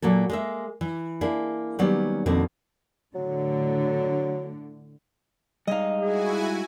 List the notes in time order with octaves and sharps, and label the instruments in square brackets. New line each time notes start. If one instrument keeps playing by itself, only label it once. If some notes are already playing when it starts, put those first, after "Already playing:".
[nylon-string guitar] A#2 F#3 A#3 A4
G#3 A#3 E5
E3
A#3 D4 E4 G#4
D#3 F#3 G3 A#3 B3 C#4
F2 B2 D3 D#3 A#3 C4
[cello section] A2 D3 [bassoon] F#3
[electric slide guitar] G3 G#3 F5 [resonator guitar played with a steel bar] D#4 D#5
[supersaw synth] E4 F#4 G#5 [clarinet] G#4